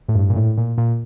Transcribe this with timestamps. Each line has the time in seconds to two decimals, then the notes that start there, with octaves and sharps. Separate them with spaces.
0.08 A2
0.15 G2
0.30 A#2
0.36 A2
0.58 A#2
0.78 A#2